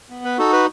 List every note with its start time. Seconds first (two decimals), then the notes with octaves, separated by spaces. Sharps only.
0.10 B3
0.25 B4
0.38 D#4 F#4 A4
0.53 B4